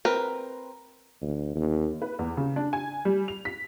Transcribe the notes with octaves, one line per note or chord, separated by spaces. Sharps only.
C4 A#4 B4
D2
D#2
B4
E2
C#3
D4
G#5
G3
F7
B6